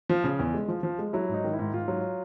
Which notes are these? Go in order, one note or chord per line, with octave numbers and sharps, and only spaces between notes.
F3
C#3
E2
G#3
F3
F3
G#3
F#3 E4
G#2
D#4
D#3
E4
G#2
G#2 F4
F#3